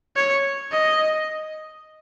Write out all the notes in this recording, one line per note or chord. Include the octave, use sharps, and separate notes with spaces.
C#5
D#5